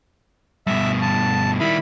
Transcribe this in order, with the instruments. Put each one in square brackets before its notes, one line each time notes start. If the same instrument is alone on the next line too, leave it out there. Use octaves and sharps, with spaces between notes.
[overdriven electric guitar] G2 B2 [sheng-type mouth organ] E5
[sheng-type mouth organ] A5
[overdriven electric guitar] D#3 G3 [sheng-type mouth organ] E4 B5